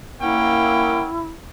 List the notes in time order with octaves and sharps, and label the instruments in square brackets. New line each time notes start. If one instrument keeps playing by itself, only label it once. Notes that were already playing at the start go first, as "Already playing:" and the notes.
[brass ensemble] A#3 [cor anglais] C#4 [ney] E4 [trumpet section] F#5 G5